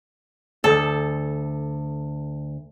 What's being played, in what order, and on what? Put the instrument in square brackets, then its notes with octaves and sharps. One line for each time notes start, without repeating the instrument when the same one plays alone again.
[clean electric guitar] D2 [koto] A4